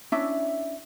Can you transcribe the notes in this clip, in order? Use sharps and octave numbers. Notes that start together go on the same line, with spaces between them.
C#4 D4 E4 E5